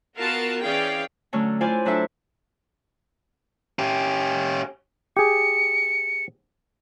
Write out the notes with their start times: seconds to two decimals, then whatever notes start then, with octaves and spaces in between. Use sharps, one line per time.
0.16 B3 F4 F#4 A#4 F5 A5
0.61 E3 C#4 G#4 D5 F5 G5
1.33 D3 F#3 A3 C#4 D4
1.61 E4 F4 C5 D5 G#5
1.85 F#3 D4 A4 E5
3.79 C#4 G4
5.17 G4 G#4 C#7